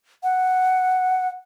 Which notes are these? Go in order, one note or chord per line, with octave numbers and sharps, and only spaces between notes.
F#5